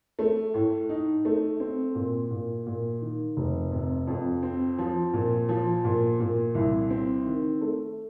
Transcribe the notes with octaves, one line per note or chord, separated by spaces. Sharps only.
A3
A2
D#4
A3
C4
A#2
A#2
A#2
D#3
F1
C3
F2
C4
F3
A#2
F3
A#2
A#2
C2
C4
D#3
A3